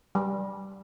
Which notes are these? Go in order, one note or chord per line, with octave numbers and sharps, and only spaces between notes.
G3